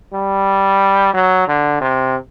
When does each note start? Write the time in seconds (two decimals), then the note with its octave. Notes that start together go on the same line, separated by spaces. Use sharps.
0.13 G3
1.14 F#3
1.48 D3
1.81 C3